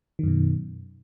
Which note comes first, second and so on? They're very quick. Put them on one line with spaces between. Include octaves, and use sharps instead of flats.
D#3 F#2 B2